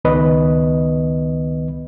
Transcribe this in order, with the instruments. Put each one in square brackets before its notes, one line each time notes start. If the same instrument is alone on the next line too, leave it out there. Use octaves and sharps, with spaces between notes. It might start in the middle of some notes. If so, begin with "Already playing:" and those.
[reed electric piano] C#2 D#3 B3 B4 D#5